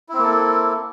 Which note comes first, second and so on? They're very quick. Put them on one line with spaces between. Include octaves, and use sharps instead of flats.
E4 C4 A#3 A4